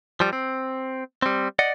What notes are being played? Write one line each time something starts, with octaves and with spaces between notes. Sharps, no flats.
F3 G3
C4
G3 C4
D5 D#5 F#5